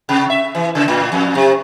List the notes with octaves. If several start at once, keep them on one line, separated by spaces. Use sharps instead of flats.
C3
E5
E3
C#3
A2
F2
C3